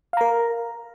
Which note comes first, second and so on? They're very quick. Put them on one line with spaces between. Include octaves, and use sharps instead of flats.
F5 A#5 A#4